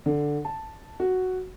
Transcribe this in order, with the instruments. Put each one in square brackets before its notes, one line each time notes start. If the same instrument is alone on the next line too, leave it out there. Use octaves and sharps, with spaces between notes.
[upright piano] D3
A5
F#4